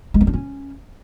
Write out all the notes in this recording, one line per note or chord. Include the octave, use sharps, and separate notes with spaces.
G#3
C4
D4
C#4